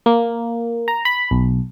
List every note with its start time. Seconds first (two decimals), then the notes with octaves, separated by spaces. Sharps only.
0.06 A#3
0.88 A#5
1.05 B5
1.31 B1